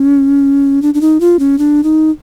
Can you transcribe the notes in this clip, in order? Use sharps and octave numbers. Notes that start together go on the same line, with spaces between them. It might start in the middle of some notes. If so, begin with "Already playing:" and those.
Already playing: C#4
D4
D4
D#4
F4
C#4
D4
D#4